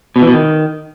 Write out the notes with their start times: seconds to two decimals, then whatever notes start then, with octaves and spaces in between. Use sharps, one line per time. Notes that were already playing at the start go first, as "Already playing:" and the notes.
0.16 B2
0.22 E3
0.27 B2
0.33 D#3